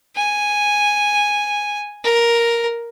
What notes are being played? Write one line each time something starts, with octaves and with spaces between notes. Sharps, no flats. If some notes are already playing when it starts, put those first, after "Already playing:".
G#5
A#4